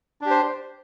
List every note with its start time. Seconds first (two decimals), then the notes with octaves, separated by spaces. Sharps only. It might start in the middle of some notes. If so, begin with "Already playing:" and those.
0.21 D4
0.26 G4
0.30 C5